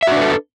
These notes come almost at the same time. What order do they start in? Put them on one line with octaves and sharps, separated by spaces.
E5 F#4 D4 B4 A4